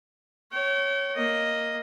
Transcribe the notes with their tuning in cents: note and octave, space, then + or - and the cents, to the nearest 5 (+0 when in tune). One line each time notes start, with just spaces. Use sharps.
C#5 +0 G5 -40
A#3 +0 D#5 +0